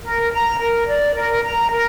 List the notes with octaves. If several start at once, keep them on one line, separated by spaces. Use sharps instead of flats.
A#4
A#5
A#4
D5
A#4
A#5
A#4